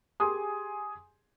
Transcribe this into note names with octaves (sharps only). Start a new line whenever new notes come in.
G4 G#4 G#5 C6 D#6